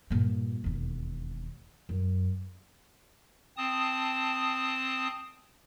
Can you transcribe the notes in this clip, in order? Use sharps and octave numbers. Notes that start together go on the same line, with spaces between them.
G2 A#2
E1 D#2
F#2
C4 A5 D#6